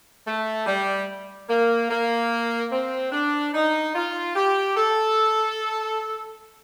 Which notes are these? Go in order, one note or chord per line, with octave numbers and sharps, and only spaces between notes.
A3
G3
A#3
A#3
C4
D4
D#4
F4
G4
A4